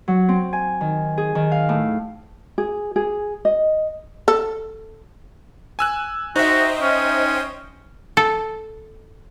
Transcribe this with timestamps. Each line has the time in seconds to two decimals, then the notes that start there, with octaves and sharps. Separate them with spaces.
0.08 F#3
0.29 C4
0.53 G#5
0.81 D#3
1.18 G#4
1.35 D#3
1.52 F5
1.69 A2
2.58 G#4
2.96 G#4
3.45 D#5
4.28 A4
5.79 G#5 E6 F#6
6.36 D#4 F#4 C5 D#5 E5 G5
6.81 C#4
8.17 A4